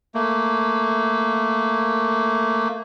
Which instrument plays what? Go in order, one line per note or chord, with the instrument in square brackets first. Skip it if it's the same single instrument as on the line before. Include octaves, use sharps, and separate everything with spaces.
[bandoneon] A3 A#3